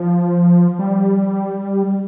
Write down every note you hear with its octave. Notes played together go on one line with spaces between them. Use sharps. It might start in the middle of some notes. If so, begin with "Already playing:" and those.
Already playing: F3
G3